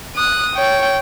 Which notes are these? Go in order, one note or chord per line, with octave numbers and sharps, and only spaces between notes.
D#6 F#6
C#5 G5